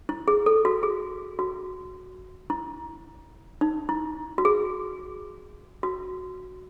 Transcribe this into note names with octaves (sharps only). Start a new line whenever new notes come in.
E4
G#4
A4
F#4
G#4
F#4
E4
D#4
E4
F#4
G#4
F#4